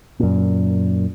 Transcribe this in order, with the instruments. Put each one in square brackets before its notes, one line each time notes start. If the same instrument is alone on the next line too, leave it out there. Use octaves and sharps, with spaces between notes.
[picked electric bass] F#2 A#2